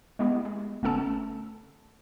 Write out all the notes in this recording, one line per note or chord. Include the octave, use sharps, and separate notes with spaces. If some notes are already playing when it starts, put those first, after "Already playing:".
G#3 A3 B3 E4 G4
G#3
G1 A3 B3 C#4 A4 A5